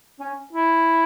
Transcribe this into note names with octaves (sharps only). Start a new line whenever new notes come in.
C#4
E4